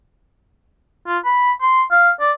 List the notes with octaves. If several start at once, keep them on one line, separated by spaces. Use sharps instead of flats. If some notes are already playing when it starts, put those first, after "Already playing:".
F4
B5
C6
F5
D5